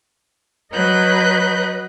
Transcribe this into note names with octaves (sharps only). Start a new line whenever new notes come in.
F#3 B4 D#5 F#6 G6